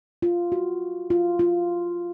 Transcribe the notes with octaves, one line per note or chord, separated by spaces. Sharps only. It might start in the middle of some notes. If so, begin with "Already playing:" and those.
F4
F#4
F4
F4